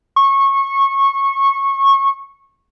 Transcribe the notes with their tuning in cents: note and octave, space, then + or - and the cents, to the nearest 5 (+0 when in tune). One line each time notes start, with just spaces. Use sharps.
C#6 -20